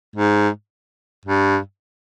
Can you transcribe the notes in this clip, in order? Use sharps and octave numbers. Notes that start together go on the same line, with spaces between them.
G#2
G2